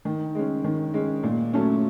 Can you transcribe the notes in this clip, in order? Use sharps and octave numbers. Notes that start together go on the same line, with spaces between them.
D#3
G#3 C#4
D#3
G#3 C#4
A#2
F#3 A3 C#4